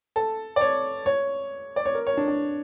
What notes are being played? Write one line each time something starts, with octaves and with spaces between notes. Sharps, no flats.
A4
D5
C#5
C#5
D5
C#5
A#4
C#5
D4
D4